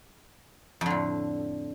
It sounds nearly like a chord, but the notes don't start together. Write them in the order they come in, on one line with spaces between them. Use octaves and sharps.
F2 D3 A2